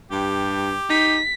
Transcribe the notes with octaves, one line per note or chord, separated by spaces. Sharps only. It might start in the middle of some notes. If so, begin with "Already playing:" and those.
G2 G4
D#4 B6